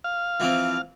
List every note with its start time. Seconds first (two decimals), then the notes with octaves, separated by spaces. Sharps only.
0.04 F5
0.40 E3 F3 C4